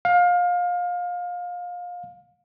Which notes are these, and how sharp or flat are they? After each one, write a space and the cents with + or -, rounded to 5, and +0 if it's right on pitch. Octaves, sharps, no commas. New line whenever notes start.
F5 +25